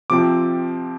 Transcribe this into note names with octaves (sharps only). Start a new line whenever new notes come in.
C3 F3 C4 D6